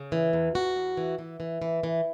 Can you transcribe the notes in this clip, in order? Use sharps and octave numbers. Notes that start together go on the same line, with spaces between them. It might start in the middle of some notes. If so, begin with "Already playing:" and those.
Already playing: C#3
E3
E2
E2 F#4
E2
E3
E3
E3
E3
E3